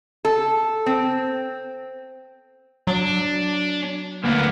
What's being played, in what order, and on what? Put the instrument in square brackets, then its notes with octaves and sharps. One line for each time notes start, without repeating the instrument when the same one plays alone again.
[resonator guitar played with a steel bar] A4
C4
[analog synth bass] F#3 [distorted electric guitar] D4
[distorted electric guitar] D2 [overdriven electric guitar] A#3 B3